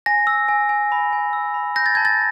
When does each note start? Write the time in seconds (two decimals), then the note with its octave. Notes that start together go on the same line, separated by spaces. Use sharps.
0.06 G#5 A#6
0.27 E6
0.49 G#5
0.69 G#5
0.92 B5
1.13 G#5
1.33 E6
1.54 B5
1.76 G6 A#6
1.86 A6
1.95 A5 G#6
2.05 A6